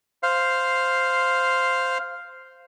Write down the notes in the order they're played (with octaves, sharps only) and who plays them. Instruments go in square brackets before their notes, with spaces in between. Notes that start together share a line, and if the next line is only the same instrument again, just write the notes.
[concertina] C5 F5